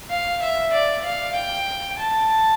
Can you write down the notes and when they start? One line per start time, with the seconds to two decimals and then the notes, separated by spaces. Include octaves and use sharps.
0.10 F5
0.41 E5
0.72 D5
1.04 F5
1.35 G5
1.99 A5